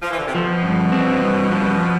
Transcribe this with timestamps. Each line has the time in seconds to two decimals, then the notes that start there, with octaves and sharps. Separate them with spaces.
0.03 F3
0.11 E3
0.18 D3
0.26 C3
0.34 B2 F3
0.63 G2
0.92 C4
1.21 G2
1.50 F3